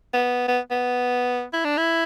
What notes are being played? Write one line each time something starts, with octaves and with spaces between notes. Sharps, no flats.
B3
B3
B3
E4
D4
E4